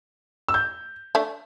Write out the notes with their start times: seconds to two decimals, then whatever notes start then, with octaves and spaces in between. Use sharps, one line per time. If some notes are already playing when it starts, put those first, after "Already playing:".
0.49 E6
0.54 G6
1.15 A3 D4